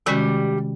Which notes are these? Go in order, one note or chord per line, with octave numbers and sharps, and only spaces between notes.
C3 D#3 G3 G#3 C#4 F#4